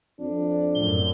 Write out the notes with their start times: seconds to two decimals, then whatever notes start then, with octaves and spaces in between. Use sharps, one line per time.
0.20 F2 D4
0.75 F#2 A2 G7